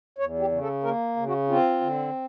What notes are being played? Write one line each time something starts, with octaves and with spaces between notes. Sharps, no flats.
E2 C#5
G4
C#3
A4
A#3 A#4
C#3
F#4
C4 F4
D3